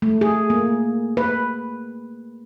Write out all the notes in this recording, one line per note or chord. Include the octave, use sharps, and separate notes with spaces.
A3
G#4
A#3
B4